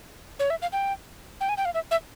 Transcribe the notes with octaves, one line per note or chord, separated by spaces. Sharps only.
C#5
E5
F5
G5
G5
G#5
G5
F5
E5
E5